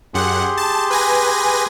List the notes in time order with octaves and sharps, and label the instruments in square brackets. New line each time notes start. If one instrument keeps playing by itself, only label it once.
[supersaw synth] F#2 F#5 [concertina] G4 G#4 C6
[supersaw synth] A5
B4 G#5 A#6